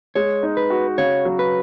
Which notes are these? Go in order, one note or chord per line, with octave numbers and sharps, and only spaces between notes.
G#3 C#5
D#4
B4
F#4
C#3 C#5
F#3
B4